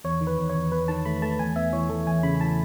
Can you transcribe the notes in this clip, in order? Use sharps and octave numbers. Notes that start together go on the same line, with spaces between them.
E2 C#5
D#3
B4
E2
C#5
E2
E2 B4
D#3 A5
A3 B5
A3 A5
E2 G#5
B3 E5
E3 C#5
E3 A4
E2 G#5
C#3 B5
E3 A5